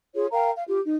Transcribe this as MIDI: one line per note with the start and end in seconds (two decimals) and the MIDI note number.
0.15 0.26 65
0.15 0.26 68
0.15 0.26 73
0.32 0.51 70
0.32 0.51 77
0.32 0.51 79
0.32 0.51 82
0.56 0.63 77
0.69 0.79 65
0.69 0.79 67
0.85 0.96 63